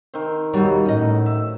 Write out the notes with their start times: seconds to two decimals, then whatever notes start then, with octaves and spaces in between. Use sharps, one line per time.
0.14 D#3 C4
0.53 D#2 B2 F#3 G3 D#4
0.85 A2 C#4 D#5
1.26 E5